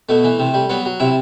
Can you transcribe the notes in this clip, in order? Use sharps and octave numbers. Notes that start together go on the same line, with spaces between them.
B2 A3
E3
C3
G3
F#3 B3
F#3
C3 E4